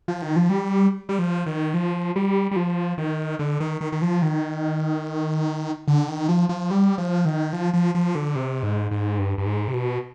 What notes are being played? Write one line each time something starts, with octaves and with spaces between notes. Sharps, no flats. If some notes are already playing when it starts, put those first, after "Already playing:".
F3
D#3
F3
G3
G3
F3
D#3
F3
G3
G3
F3
D#3
D3
D#3
D#3
D#3
F3
D#3
D3
D#3
F3
F3
G3
F3
D#3
F3
F3
F3
D3
C3
G#2
G#2
G2
G2
G#2
C3
B2